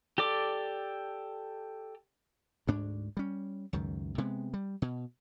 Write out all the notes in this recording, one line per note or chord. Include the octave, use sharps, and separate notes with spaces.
G4 A4 D5 D6
D2 G#2 D4
G3 C#4
C#2 F#2 D#3
C3 G#3 B3
G3
B2